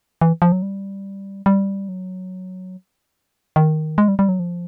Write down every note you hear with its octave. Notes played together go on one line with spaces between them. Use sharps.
E3
F3
F#3
G3
G3
F#3
D#3
G#3
G3
G3
F#3
F3